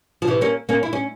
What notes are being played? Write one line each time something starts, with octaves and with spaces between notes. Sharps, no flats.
F3
C3 E3
A#3 C#4
A#3 C#4
E4
C#4